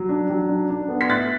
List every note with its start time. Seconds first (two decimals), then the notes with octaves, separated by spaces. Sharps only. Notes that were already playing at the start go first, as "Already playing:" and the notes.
Already playing: F#3
0.09 D4
0.30 F#3
0.49 D4
0.69 D4
0.89 B3
1.01 B6
1.09 A2 F#6 A6